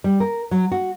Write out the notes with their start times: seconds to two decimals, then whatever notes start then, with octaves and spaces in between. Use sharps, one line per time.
0.04 G3
0.20 A#4
0.51 F#3
0.72 F#4